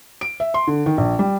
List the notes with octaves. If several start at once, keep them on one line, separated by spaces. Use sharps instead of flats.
D7
E5
C6
D3
D#3
A#1
G3